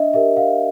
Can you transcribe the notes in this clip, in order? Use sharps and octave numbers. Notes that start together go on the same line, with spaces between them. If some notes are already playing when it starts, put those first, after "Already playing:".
Already playing: D4 D#5 E5
G4 A#4 E5
F5